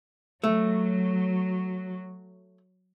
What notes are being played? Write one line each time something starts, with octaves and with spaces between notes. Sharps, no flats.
F#3 A3